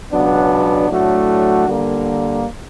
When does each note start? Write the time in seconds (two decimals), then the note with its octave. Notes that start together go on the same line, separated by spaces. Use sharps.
0.11 C#2 B2 F#3 B3 D4
0.89 A2 F#3 A3 D4 F#4
1.67 D3 G3 A#3